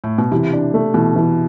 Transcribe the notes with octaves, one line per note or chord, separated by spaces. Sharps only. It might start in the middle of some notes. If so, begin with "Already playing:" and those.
A2
B2
C3 E3
D4
A3
B2 E3
E3